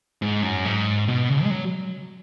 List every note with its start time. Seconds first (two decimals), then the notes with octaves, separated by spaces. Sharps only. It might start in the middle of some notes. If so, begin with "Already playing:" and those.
0.22 G#2
0.43 F#2
0.65 G#2
1.08 B2
1.29 C#3
1.44 G#3
1.50 F#3